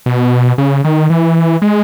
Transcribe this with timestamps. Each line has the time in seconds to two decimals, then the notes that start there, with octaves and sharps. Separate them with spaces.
0.06 B2
0.58 C#3
0.84 D#3
1.10 E3
1.62 G#3